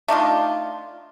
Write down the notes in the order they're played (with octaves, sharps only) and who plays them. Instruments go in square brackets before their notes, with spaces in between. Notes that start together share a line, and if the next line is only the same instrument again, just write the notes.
[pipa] A3 D4 D#4 F4